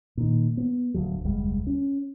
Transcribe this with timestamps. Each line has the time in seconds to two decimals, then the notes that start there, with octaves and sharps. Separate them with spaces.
0.17 A#2 D#3
0.57 B3
0.94 D1 D2 F#3
1.25 F1 D2 G3 G#3
1.67 C#4